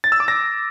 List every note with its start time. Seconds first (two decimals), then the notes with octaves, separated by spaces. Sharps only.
0.04 A6
0.12 E6
0.20 D6
0.28 A#6